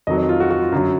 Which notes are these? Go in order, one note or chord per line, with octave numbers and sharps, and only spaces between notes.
F2 D#3 F#3 D#5
D#5
F4
F#4
F#4
F4
F#2 D3 F#3